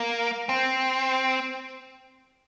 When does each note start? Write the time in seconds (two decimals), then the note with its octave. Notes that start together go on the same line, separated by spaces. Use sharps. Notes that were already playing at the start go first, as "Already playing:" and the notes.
Already playing: A#3
0.49 C4